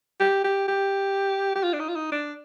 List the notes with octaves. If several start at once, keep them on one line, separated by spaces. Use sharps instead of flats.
G4
G4
G4
G4
F4
D4
D#4
F4
D#4
D4